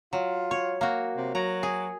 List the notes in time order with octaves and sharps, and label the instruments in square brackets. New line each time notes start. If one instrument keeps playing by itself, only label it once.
[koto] F#3 [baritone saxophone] F4
[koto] C#5
A#3 F#4
[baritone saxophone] C3
[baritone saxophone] F#3 [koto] A#5
[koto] G#4